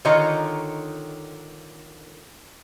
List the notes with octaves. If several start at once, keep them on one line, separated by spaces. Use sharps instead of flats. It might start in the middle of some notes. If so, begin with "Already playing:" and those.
D3 D#3 F4 C#5 D#5 A#5